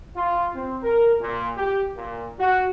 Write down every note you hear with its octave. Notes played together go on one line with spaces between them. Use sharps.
F4
C4
A#4
A#2
G4
A#2
F#4